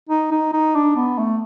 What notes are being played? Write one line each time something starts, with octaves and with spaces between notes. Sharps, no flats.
D#4
D#4
D#4
D4
B3
A3